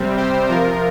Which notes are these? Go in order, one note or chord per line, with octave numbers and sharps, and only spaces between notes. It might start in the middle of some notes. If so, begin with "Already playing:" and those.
Already playing: C3 G3 C4
G4 C5
C3 F3 F4 A#4